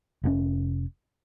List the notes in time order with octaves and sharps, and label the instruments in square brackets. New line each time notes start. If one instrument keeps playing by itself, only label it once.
[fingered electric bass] F1 A2 C#4